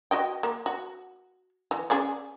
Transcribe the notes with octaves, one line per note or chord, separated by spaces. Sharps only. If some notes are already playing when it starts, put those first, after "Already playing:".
F#4 D#5 G5
A#3
F#4
E3
C#4 G#4 D5